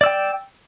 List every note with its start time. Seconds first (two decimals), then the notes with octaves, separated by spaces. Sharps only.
0.01 D5
0.04 E6
0.06 G5